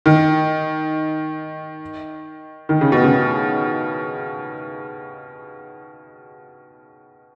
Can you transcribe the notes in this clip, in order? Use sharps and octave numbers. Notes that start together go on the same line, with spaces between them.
D#3
D#3
C#3
B2
C#3